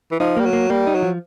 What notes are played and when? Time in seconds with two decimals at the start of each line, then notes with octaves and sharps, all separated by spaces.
0.11 E3
0.20 F3 D#4
0.37 G3 A#3
0.46 F#3
0.53 A#3
0.70 G3 A#3
0.87 D#4
0.95 F#3
1.02 F3